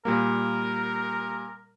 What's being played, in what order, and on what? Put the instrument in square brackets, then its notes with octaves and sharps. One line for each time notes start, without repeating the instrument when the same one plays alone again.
[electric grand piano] A#2 G3 A#3 [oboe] A#4